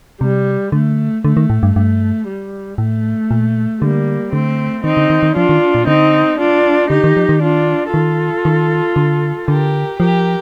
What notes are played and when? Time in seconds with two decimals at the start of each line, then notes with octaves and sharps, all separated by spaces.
0.21 C3 G3
0.72 D3 A3
1.24 D3 A3
1.37 D#3
1.50 A2
1.63 G2
1.75 G2 A3
2.27 G3
2.78 A2 A3
3.31 A#2
3.81 D3 G3 A#3
4.33 D3 A3 C4
4.84 D#3 C4 D#4
4.97 D3
5.10 D#3
5.23 D#3
5.36 F3 D4 F4
5.49 D#3
5.75 A#2
5.87 D3 C4 D#4
6.39 D4 F4
6.90 D3 D#4 G4
7.04 D#3
7.17 F3
7.29 D#3
7.42 D4 F4
7.93 D#3 F4 A4
8.45 D#3
8.96 D3
9.48 D3 G4 A#4
9.99 F3 G4 A#4